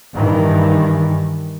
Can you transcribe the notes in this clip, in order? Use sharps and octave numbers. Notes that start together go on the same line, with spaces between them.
G2 D#3 E3